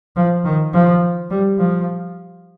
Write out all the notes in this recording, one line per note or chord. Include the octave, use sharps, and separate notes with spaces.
F3
D#3
F3
G3
F3